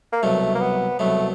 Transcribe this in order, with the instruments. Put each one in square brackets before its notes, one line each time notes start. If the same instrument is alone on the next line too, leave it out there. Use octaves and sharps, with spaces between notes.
[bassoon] A#3
[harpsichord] C2 B2 F#3 [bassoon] A3
[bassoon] A#3
B3
[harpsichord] C2 B2 F#3 [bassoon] A3